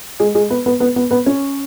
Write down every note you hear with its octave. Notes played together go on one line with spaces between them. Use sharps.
G#3 G#4
G#3 G#4
B3 B4
B3 B4
B3 B4
B3 B4
B3 B4
C#4 C#5